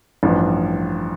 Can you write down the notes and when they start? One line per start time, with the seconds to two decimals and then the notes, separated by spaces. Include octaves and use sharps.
0.23 A1 G2 F3